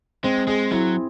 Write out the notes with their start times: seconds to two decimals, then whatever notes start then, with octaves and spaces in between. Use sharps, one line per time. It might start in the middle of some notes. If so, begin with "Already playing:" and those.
0.24 G#3 C4
0.47 G#3 G#4
0.71 F#3 E4